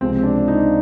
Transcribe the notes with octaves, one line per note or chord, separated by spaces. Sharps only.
C#2 C3 F3 C4
D4
D#4